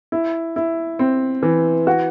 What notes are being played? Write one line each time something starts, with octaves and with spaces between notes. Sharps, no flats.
E4
E4
C4
E3
F#4